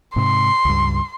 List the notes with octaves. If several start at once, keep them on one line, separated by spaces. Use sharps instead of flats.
G#2 C3 C6
C#2 G2